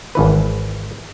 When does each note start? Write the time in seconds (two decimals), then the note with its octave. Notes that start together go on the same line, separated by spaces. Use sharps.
0.15 G#1 E3 B4